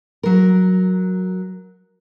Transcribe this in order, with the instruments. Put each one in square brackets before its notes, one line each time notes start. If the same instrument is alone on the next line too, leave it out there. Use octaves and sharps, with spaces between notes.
[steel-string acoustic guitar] F#3 A#4